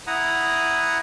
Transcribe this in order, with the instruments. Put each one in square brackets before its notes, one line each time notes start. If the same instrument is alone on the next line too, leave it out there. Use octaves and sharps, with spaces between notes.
[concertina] E4 F#5 A#5 D#6